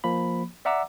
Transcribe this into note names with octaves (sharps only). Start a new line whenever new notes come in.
F3 A#3 B5
D5 E5 F#5 A#5 D6 E6